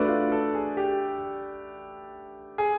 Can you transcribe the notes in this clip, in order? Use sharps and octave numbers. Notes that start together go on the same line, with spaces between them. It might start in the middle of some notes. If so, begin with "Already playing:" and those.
Already playing: A3 D4 F#4 B4 D5
F4
A4
G#4
G4
G#4